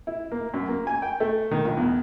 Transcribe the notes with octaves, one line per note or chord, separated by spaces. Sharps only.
E4
A#3
F#2
A#3
G#5
G5
A3
D#3
A#1
E2